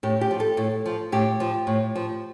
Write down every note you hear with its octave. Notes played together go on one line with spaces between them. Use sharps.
A2 G4
G4
F3
A4
A2
F3
A2 G4
F3
A2
F3